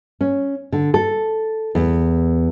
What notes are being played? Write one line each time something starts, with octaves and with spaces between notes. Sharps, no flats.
C#4
D3
A4
E2